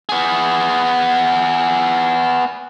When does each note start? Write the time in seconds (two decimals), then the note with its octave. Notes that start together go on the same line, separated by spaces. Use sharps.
0.09 B3 G#4